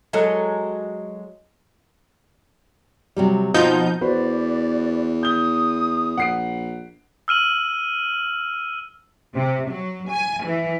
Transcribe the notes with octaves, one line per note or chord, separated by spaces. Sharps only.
F#3 G#3 A4
C3 F#3 G3
B2 F3 C4 D#4 G6
E2 F#4 B4 C5 D5
D#6 G6 G7
A#1 F#5 C7 D7
E6 F6 D#7 F#7
C3
F#3
G#5
E3